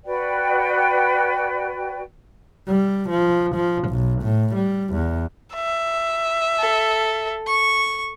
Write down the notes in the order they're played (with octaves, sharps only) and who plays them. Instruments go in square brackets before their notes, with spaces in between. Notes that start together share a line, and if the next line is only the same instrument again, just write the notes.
[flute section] F#4 B4 D5 G5
[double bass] G3
F3
F3
B1
A2
G3
E2
[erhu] E5
[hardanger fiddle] A4
C#6